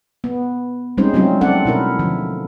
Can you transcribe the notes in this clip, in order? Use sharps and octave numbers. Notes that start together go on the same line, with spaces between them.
B3
G3 G#3 C4 C#4 D#4 C5
F#3 G3 A3 C4 C#4 F4
C4 D4 A4 D5 F#5
B2 E4 A#4
D3 F3